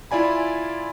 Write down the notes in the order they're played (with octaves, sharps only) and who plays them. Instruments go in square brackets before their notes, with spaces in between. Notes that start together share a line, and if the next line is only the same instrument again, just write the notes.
[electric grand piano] E4 F4 D5 G#5 B5